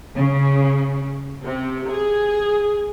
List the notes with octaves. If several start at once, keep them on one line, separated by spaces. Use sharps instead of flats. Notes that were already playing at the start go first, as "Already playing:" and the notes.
C#3
C3
G#4